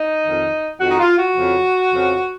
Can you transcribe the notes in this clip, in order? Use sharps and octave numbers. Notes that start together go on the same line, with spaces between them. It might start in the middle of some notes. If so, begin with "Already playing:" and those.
Already playing: D#4
F2 D#3
F2 D#3 F#4
D#4
F4
F#4
F2 C#3 F3
F2 C#3 F3